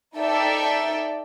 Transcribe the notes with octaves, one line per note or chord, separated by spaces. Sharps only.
D#4 A4 D5 E5 G5